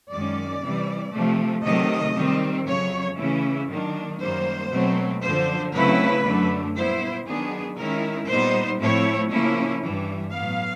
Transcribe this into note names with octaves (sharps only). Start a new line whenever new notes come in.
F#2 D#3 G#3 C#4 D5
C3 E3 G3
C3 F3 A3
C3 D#3 F#3 A3 D#5
D#3 G3 C4
F2 C#3 F#3 C#5
C#3 E3 A3 C#4 E4
D#3 F#3 A#3 D4
F#2 D#3 G3 A#3 C5
B2 F#3 A3 C4
F#2 D3 F3 C5
C#3 F#3 A3 C4 E4 B4
F#2 D3 F#3 A3 D4
A#2 G3 B3 E4 C5
D#3 F#3 B3 D4 G#4
D#3 G#3 C#4 E4 A#4
A#2 G3 B3 D#4 C5
A2 F3 A3 C4 E4 C#5
C#3 F3 A#3 C#4 E4
G2 E3 G3
A2 F#3 B3 F5